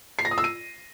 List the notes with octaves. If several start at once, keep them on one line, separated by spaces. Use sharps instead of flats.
C7
A#6
D#6
E6
D#7